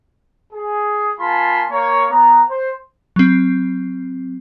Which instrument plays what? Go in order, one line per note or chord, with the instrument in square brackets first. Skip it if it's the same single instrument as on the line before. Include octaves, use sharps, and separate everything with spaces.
[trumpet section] G#4
A#3 F4 G#5 A5 B5 C6
A#3 C#5
B3 A#5
C5
[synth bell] F#3 C4